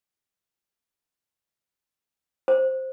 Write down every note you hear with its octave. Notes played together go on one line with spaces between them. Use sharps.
C5